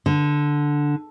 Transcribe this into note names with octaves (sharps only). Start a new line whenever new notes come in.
D3